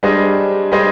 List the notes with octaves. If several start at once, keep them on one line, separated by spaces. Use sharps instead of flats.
G3 D4 G#4 C5 D#5
G3 D4 G#4 C5 D#5